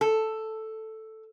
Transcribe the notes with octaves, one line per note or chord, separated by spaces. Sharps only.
A4